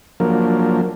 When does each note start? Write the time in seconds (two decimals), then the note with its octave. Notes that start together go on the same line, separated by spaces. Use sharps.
0.20 F3 F#3 A#3 D4 A#4